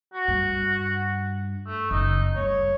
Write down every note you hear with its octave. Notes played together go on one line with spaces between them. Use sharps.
F#4
G2
A3
F#1 D#4
G2 C#5